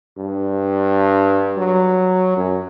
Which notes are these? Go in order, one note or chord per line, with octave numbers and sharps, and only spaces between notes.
G2
F#3
F#2